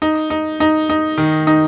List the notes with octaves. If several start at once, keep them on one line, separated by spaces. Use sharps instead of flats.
D#4
D#4
D#4
D#4
D#3
D#4